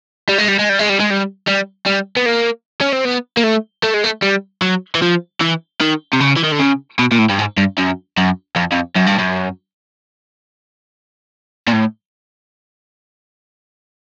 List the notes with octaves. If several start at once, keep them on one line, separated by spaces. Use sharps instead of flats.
G3
G#3
G3
G#3
G3
G#3
G3
G#3
G3
G3
G3
B3
A#3
C#4
C4
B3
A#3
A3
A3
G#3
A3
G3
F#3
E3
F3
E3
D#3
C3
C#3
E3
D#3
D3
C#3
B2
A#2
A2
G2
G#2
G2
F#2
F#2
F2
F2
F#2
G2
F#2
A#2
A2